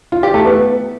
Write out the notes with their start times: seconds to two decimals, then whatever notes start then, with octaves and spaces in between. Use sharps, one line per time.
0.12 F4
0.23 G4
0.34 A3
0.45 B3